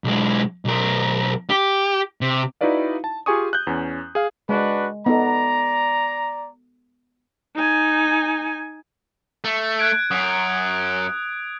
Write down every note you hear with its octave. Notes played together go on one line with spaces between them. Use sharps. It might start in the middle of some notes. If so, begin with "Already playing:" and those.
B1 G#3
B1 A#4
G4
C3
D#4 E4 F#4 B4 D5 F5
A5
F4 G4 G#4 G#5 C#6 D#6
F#6 G6
E2 C#4
G#4 F5
G#3 D4 F#4 B4
B3 D#4 A4 D5 A#5
D#4 G#5
A3
F#6 G#6 D7
F#2 D#6